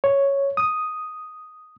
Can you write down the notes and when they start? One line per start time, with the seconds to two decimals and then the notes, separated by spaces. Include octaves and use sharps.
0.04 C#5
0.57 D#6